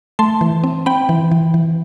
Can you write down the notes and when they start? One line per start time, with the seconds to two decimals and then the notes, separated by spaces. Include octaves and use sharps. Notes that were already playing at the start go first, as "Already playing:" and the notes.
0.19 A3 A5 C6
0.41 E3
0.64 C4
0.86 C4 G5 B5
1.09 E3
1.32 E3
1.54 E3